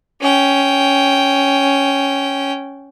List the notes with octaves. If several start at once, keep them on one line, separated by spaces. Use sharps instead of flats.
C#4 G5